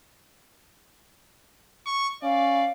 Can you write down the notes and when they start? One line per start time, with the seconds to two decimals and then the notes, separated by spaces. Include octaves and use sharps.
1.86 C#6
2.23 C#4 D5 F5